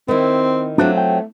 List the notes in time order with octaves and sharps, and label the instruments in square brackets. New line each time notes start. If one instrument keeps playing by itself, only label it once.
[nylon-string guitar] D#3 E4 [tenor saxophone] C4
[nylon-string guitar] F#3 C4 F4 [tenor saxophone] A3 [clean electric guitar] D4 F#4
[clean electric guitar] G5